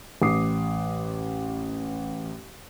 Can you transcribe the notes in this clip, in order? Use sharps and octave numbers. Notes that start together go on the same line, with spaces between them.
A1 D6 D#6 C7